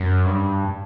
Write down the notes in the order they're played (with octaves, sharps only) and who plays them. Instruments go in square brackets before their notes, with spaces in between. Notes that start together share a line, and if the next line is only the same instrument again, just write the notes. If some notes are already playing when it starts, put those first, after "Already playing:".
Already playing: [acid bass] F#2
G2